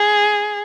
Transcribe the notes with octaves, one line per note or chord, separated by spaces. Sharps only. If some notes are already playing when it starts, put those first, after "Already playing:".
Already playing: G#4